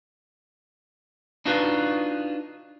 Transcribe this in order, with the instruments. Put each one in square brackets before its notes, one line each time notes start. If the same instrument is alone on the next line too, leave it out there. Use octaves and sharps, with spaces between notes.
[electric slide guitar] D4 D#4 F4 F#4 B4